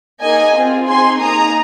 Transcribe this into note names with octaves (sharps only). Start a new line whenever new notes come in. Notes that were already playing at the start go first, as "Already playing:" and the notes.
A#3 D#4 G#4 D#5 G#5
C4 F4 G#4
C4 D#4 G#4 G#5 C6
A#3 D#4 G#4 A#5 D#6